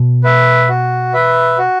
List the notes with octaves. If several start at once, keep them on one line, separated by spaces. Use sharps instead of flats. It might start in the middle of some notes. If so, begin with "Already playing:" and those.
Already playing: B2
B4 E5
F#4
B4 E5
F#4